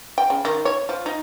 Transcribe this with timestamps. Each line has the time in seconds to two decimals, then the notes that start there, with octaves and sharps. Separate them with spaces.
0.18 G5
0.30 C#3
0.45 D#3
0.65 C#5
0.89 F3
1.06 D#4